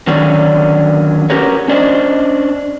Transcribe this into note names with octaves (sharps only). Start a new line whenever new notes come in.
D3 D#3 F#3 C#4 D4 D5
C#4 F#4 G4 A#4 B4 C#5
C#4 D4 C5 D#5